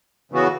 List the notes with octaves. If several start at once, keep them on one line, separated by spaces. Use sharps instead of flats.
C#3 E3 B3 F#4